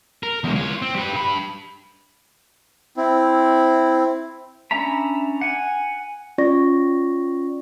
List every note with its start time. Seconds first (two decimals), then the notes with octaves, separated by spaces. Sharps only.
0.23 A#4
0.44 E2 G#3
0.56 F4 C#5
0.82 C4
0.96 G3 B4
1.13 G2 B5
2.97 C4 E4
4.71 C#4 D4 E5 A#5 B5
5.41 F#5 G#5
6.38 C#4 F4 D5 C#6 A#6